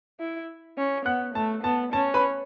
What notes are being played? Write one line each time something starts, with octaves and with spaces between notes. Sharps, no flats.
E4
C#4
B3 F#5 F#6
A3 A5
B3 A5
C#4 A5
B4 B5